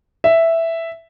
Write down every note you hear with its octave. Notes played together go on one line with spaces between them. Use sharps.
E5